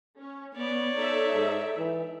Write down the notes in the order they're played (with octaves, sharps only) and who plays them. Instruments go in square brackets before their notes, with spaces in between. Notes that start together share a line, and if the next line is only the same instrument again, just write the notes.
[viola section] C#4
[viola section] B3 [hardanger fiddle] C#5 D5
[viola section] D#4 A4 E5
[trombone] G#2
E3